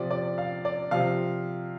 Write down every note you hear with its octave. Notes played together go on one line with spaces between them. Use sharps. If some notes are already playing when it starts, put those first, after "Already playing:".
Already playing: C3 F3 D5
D5
F5
D5
C3 F3 F5